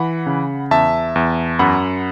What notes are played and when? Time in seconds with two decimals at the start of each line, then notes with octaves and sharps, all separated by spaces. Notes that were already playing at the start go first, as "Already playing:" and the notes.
Already playing: E3 F#5 B5
0.26 C#3
0.71 E2 E5 A5
1.16 E2
1.59 F#2 F#5 B5